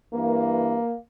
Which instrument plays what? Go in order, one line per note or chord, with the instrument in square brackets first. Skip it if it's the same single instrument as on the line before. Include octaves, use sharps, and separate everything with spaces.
[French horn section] G2 E3 A#3